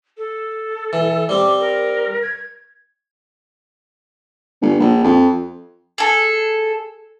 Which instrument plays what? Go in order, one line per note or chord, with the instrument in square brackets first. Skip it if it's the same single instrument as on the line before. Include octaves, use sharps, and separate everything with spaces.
[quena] A4
[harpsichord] E3
[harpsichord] G3 C4 [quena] D6
[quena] A#4
G#6
[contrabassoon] G1
A#1
F2
[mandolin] G#4 A4